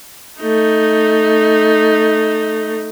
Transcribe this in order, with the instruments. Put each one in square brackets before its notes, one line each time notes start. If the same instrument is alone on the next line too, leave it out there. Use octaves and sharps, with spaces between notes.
[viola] A3 D#4